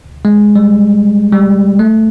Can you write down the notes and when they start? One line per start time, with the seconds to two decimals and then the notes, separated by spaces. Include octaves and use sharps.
0.25 G#3
0.55 G3
1.33 G3
1.79 A3